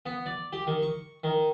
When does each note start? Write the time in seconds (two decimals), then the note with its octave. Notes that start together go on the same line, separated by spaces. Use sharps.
0.06 B3
0.26 D5
0.53 G4
0.67 D#3
0.82 C#6
1.24 D#3